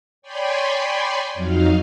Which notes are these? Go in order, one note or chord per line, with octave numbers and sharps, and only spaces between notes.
C#5 D5 G5 G#5 B5 C6
F2 F#3 D#4 F5